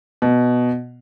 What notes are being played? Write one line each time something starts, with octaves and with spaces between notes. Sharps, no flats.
B2